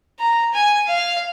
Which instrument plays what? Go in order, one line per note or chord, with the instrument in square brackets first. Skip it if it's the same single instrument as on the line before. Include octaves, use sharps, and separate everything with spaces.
[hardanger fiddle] A#5
G#5
[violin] F5